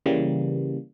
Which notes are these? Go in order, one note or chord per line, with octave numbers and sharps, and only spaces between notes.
C#3 E3 G3 A#3